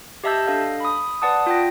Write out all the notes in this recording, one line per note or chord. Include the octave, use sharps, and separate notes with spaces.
G4 D#5 E5 A5 E6 G6
D4 A4 D#5 F5
B5 D#6
B4 D5 F#5 A5 D#6
F4 G5 A#6